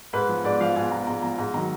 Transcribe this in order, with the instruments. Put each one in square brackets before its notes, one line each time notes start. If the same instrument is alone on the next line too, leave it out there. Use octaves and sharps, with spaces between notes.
[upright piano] G#2 B4
F3
G#2 D5
F3 F5
G#2 G#5
F3 A#5
G#2 A#5
F3 A#5
G#2 A#5
D#3 F#3 A#5